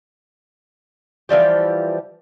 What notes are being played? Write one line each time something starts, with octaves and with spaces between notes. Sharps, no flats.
E3 F3 G3 G4